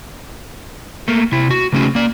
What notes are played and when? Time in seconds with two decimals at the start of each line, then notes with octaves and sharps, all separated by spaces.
1.08 A3 A#3
1.32 C3 E4
1.51 F#4
1.72 C#3 A3 C#4 F#4 G#4
1.95 A#3 D5